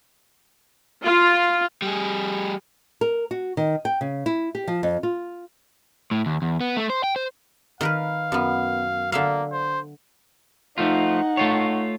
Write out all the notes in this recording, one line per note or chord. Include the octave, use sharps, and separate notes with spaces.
F4
G3 G#4
A#4
F#4
D#3
G5
C#3
E4
G4
F3
F2
F4
A2
D#2
E2
B3
A3
C5
G5
C5
D#3 A#4 B4 F5
F#2 B3
D3 A#3 E5 F5
C5
F3 A3 D#4 F4 F#5
A3 F4 C#5